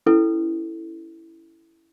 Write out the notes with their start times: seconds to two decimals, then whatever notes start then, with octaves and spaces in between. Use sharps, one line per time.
0.06 C#4 E4 A4 B4